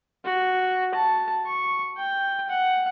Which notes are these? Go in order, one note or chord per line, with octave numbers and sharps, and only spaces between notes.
F#4
A5
C#6
G5
F#5